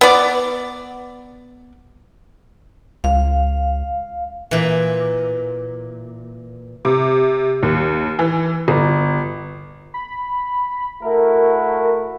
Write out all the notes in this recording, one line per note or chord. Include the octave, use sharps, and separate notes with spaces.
B3 D5
C#2 F5
A#2 E3
C3
D#2
E3
G1
B5
A3 E4 F#4 A#4